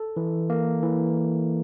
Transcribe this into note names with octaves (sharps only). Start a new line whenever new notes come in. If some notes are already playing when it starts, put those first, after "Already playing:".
Already playing: A4
E3
A#3
E3